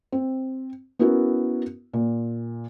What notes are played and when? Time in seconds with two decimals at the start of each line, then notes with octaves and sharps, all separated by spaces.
0.12 C4
0.99 B3 C#4 E4 F#4 A#4
1.93 A#2